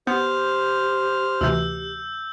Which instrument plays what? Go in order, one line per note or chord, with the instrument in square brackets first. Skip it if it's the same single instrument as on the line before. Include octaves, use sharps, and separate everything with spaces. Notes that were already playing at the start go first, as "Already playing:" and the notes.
[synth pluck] B3 [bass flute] G4 [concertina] C5 F6 [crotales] G6
[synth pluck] D2 C3 E3 [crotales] E6 G6